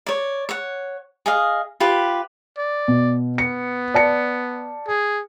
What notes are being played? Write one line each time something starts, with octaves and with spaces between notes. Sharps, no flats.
C#5 D5
C#5 F#5
G#4 D#5 F5
F4 G4 B4
D5
B2
B3 C#7
D5 A5 C#7
G#4